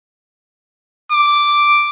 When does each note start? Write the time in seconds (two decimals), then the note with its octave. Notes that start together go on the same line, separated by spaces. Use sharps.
1.12 D6